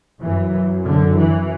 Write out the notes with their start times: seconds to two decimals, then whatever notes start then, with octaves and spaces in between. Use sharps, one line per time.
0.21 F#2 E3
0.82 D3
1.12 E3